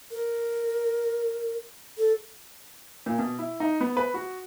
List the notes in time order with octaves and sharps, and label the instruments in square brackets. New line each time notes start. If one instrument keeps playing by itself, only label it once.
[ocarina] A#4
A4
[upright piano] A#2
B2
E4
D#4
B3
B4
F#4